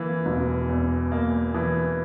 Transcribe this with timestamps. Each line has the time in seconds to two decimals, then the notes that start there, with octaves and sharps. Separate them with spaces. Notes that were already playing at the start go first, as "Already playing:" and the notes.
Already playing: E3 A#3
0.26 E1
0.69 E2
1.12 A#3
1.54 E3